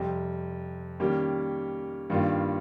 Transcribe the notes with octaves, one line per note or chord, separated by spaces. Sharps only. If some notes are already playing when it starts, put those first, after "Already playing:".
Already playing: F2 C3 G3 C4 G4
D#3 G3 A#3 C#4 G4
G2 D#3 G3 A#3 F4